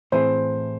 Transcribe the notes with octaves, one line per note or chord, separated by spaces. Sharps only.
A2 E3 C4 E4 G#4 C5